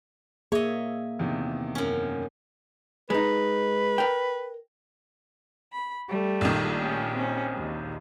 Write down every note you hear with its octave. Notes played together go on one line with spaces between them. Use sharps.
A#3 G#4 C#5 D#5 E5
E2 C3 D#3
F#2 C#4
G#3 D#4 B4
A#4 G5
B5
G3 A3
A#1 D#3
A3 C#4 G4
C4 C#4
D#2